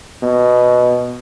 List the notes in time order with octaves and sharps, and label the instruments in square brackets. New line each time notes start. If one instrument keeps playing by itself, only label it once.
[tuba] B2